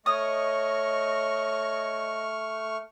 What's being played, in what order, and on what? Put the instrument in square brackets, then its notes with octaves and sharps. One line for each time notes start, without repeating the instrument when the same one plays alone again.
[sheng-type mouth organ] A3 C#6 F6 [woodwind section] C#5 D#5 [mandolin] D#6